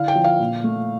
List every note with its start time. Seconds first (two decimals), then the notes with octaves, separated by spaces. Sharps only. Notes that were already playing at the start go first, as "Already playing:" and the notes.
Already playing: D3 E4 F5
0.08 G5
0.15 F3
0.24 F5
0.40 A#2
0.64 A3